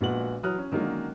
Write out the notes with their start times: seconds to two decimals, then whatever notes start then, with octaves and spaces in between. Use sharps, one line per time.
0.01 A#1 A#2 G#3 B3 F#4 F#7
0.43 E3 F#3 D#6 F6 F#6
0.58 C#4
0.72 D3 D#3 F#3 G#3 A#3 C#4